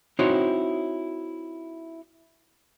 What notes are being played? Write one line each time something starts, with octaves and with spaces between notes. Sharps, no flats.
C4 D#4 E4 F#4 C5 C#5